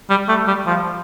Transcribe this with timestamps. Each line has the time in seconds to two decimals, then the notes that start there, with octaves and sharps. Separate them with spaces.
0.10 G3
0.29 A3
0.47 G3
0.66 F3